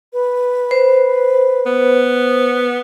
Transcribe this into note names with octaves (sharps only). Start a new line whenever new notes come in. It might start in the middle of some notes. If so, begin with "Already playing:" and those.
B4
C5
B3